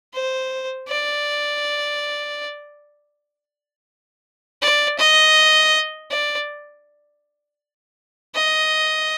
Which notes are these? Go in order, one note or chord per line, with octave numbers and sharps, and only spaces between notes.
C5
D5
D5
D#5
D5
D#5